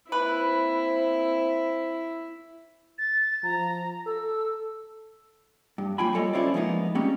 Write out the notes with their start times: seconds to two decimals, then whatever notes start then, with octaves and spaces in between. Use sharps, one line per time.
0.12 A#3 C4 E4 B4 C5
2.98 A6
3.43 F3 A#5
4.06 A4 E6
5.78 G2
5.98 F#3 A#3 F4 G5 G#5 B5
6.13 G3 F4 A4 C#5 D#5
6.33 C#4 D4 E4 F4 C5 D5
6.54 F3 G#3 A#3 B3 D#4
6.95 G3 G#3 A#3 C4 C#4 C#5